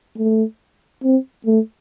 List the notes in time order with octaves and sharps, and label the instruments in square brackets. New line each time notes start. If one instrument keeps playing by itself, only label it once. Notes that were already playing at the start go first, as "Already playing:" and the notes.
[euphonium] A3
C4
A3